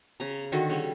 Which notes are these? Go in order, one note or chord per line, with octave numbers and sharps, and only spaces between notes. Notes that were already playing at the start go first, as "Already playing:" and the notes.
C#3 A#5
D3 D#3 F#4 A4
C#3 G3